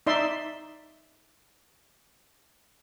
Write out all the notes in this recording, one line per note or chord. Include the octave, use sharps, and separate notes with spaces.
D#4 D5 E5 C6